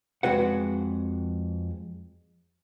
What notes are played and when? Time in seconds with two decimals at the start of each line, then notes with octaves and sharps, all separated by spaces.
0.23 F2 G#3 F#4 B4 F#5